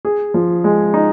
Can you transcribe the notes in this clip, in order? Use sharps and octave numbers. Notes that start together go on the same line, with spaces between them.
G#4
F3
G#3
D#4